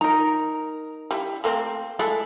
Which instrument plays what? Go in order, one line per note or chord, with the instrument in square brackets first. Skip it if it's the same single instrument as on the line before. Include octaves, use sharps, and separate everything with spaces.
[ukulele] D#4 A#4 [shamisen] A#5
[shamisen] G3 E4
A3 A#3 C4
[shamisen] G#3 A3 E4 [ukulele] A4